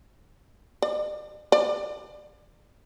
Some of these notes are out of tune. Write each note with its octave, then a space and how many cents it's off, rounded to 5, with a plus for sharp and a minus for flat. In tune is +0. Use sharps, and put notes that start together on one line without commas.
D5 +45
D5 +20